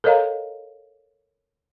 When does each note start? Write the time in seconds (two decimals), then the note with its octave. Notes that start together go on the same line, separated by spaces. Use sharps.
0.04 A4 A#4 C#5 D#5 F5 A#5